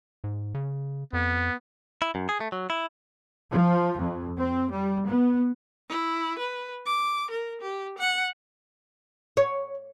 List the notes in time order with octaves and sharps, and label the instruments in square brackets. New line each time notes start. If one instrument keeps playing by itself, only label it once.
[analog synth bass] G#2
C#3
[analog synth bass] F2 [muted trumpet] B3
[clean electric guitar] E4
F#2
G#4
A3
F#3
E4
[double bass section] F3
F2
C4
G3
B3
[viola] E4
B4
D6
A#4
G4
F#5
[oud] C#5